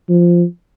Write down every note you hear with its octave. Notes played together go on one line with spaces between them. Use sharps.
F3